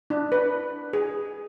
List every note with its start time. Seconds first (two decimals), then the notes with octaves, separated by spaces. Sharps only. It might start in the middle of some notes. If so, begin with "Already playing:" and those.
0.10 D4
0.32 B4
0.93 G#4